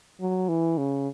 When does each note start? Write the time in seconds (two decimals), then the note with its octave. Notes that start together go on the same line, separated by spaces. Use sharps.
0.21 F#3
0.48 E3
0.78 C#3